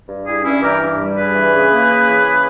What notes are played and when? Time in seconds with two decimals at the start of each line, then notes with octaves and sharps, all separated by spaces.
0.08 G2
0.25 G3 E4 G#4
0.44 G2 C#4 E4
0.62 E3 G4 A#4
0.81 G2
0.98 G3
1.16 G2 G#4 B4
1.34 E3
1.53 C#3
1.71 A#3
1.88 C#3
2.07 E3
2.24 C#3